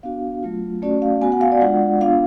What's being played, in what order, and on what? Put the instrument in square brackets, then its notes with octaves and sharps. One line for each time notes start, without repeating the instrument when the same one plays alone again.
[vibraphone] B3 D4 F#4 F5
F#3 A3 F4
A3 C#4 F#4 D5
F5
B3 F#4 G#5
F#5
F5
D5
G#3 D4 F4 F#5
B3 D4 F4 F5